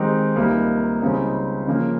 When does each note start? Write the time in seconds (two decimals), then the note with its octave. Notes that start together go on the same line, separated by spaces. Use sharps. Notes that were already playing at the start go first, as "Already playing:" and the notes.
Already playing: D#3 G#3 C4 D#4 G4
0.36 C#2 C3 G3 A#3 D#4
1.02 C#2 C#3 G3 C4 D#4
1.67 C#3 F3 A#3 C#4